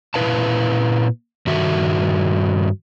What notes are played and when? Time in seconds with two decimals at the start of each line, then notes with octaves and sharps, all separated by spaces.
0.14 A#2 E4 B4 F5 A5
1.47 G2 D#3 F#4 E5